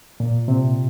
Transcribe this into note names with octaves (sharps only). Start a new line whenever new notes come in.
A#2
C3